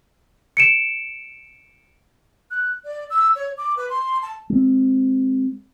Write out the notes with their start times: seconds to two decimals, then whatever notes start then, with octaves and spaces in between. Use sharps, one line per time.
0.57 C#7 D7 E7
2.51 F#6
2.85 D5
3.10 E6
3.36 C#5
3.58 D6
3.77 B4
3.90 C6
4.22 A5
4.50 G#3 C4